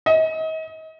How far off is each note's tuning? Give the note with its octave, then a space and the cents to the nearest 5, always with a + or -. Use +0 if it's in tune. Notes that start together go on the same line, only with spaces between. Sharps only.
D#5 +35